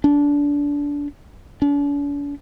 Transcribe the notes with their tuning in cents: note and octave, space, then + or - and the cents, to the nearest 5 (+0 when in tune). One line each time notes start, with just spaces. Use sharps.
D4 -25
D4 -45